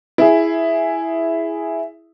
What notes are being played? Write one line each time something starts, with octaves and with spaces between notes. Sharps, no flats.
E4 G#4